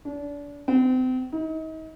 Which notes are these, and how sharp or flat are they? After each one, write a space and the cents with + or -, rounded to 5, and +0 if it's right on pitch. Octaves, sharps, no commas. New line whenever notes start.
D4 -30
C4 -35
D#4 +35